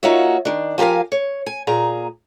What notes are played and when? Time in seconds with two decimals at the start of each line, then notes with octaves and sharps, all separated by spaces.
0.03 A#3 D#4 F4 F#4 C#5 E5
0.45 D#3 D4
0.78 F3 G4 A#4 F5 G#5
1.12 C#5
1.46 G#5
1.67 A#2 G#4 A#5